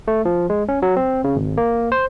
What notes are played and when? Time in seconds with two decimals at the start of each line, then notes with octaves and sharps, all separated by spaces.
0.08 A3
0.25 F3
0.50 G#3
0.69 C#4
0.82 F#3
0.97 C4
1.24 C#3
1.36 G#1
1.57 A#3
1.92 C5